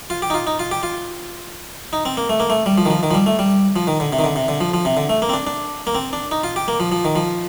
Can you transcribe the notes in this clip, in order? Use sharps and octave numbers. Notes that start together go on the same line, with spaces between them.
F4
G4
D#4
F4
D#4
F4
G4
F4
D#4
C4
A#3
A3
A#3
A3
G3
F3
D#3
F3
D#3
F3
G3
A3
G3
F3
D#3
D3
C3
D#3
D3
C3
D3
F3
F3
C3
D3
A3
A#3
C4
D4
D4
A#3
C4
D4
D#4
F4
G4
A#3
F3
F3
D#3
F3